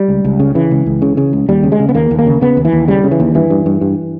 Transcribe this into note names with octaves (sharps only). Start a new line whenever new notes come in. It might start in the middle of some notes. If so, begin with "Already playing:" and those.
Already playing: G3
C#2
C#2
C#3
C#3 E3
C#2
C#2
C#3
C#3
C#2
D#2 G3
C#3
G#3
C#3
B3
D#2 A#3
D#2
A#3
C#3
C#3 B3
D#2
E3
D#2
C#3 G3
C#3
E3
D#2
G2 E3
G2
G2
G2